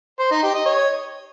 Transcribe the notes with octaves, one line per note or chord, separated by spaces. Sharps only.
C5
D#4
G4
D#5
C#5